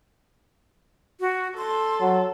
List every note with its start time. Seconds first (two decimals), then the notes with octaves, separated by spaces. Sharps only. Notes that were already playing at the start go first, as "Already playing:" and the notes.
1.21 F#4
1.58 A4 C6
2.01 F#3